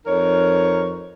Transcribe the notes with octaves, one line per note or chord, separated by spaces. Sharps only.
F2 D#4 A#4 C#5